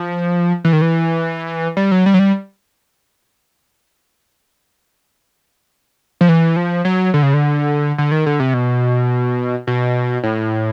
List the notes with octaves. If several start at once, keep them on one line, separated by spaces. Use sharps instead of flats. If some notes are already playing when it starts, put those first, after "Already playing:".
Already playing: F3
E3
D#3
E3
G3
F#3
G3
F#3
G3
F3
E3
F3
F#3
D3
C#3
D3
D3
D#3
D3
C3
B2
B2
A2